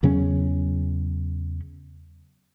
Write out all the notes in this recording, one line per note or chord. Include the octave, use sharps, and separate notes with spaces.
E2 C#3 F#3 C#4